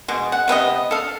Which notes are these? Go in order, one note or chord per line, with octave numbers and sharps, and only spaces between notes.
B2 G#3
F#5
C3 B3 C4 D#5
A4 F5